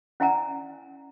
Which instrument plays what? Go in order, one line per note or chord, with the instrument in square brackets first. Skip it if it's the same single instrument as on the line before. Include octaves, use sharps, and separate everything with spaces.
[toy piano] C#4 E4 D5 F#5 G#5 A#5